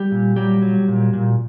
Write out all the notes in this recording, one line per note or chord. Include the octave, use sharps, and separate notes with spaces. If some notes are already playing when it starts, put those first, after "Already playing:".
Already playing: G3 G4
A#2
F#3 G3 G4
F#3
A#2
A#2